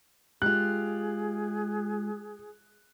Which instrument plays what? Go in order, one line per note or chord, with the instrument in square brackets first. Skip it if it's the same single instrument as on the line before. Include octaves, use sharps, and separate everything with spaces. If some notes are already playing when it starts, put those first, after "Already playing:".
[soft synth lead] G#3 [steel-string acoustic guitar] F4 G4 [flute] G#4 [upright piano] F#6